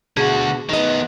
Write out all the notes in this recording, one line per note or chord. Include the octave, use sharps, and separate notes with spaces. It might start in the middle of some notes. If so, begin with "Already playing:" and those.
B2 D3 F#4 G#4
D#3 B3 D#4 D#5